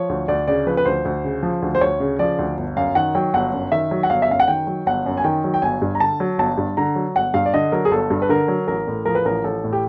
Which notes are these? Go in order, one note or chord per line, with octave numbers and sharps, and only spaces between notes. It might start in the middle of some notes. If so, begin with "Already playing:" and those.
Already playing: F3 C#5
D2
D2 D5
C#3 D5
F3 B4
B4
D2 C5
D2
C#3
F3
D2
C5
D2 C#5
C#3
F3 D5
D2
G1
F#2 F5
D#3 F#5
F#3 G5
G1 F#5
F#2
D#3 E5
F#3
F#5
G1 F5
E5
F#2 F5
F#5
D#3 G5
F#3
G1 F#5
F#2
G#5
D#3 G5
F#3
G5
G1 G#5
G2
A#5
D3 A5
F#3
G1 A5
G2
D3 A#5
F#3
G1 F#5
G2 F5
D5
D3 D#5
F#3 A#4
G#4
G1 A4
G2
B4
D3 A#4
F#3
A1 A#4
A2
F3 A#4
B4
A1 A#4
A1 A4
A2
G4